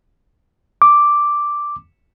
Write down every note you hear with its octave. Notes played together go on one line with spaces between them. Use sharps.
D6